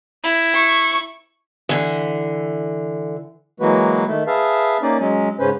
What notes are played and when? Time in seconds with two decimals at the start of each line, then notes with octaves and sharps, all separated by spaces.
0.24 E4
0.55 C#6
1.69 D3 E3
3.60 E3 F#3 G#3 A#3 F#4 B4
4.07 D#3 A3
4.27 G#4 B4 E5 F5 A5
4.82 A#3 C#4 D#4 D5
4.99 F#3 G#3 C#4
5.39 G#2 C#3 C#4 B4 C5